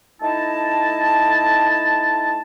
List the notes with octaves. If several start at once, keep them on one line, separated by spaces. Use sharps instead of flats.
A3 D#4 E4 D#5 A5